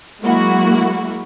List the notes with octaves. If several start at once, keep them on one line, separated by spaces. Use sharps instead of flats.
F#3 G#3 A#3 E4 F#4